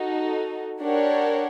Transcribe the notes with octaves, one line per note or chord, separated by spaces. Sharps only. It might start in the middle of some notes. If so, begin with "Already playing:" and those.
Already playing: D#4 F#4 A4
D4 G4 A#4 C#5 F#5